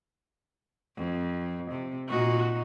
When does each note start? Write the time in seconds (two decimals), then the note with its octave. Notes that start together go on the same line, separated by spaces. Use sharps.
0.96 F2
1.71 C3
2.08 A#2 D#4 F4 F#4